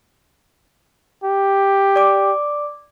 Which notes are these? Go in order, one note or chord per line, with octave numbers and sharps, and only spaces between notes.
G4
D5 D6